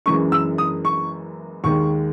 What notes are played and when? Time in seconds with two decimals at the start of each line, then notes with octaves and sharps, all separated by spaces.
0.06 F#1 F#2 E3 G#3 C#6
0.32 E6
0.58 D#6
0.85 C#6
1.64 D#2 D#3 G#3 C#6